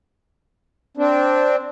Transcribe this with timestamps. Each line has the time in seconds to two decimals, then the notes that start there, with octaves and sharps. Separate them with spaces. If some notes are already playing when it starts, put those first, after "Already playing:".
0.97 C4 D4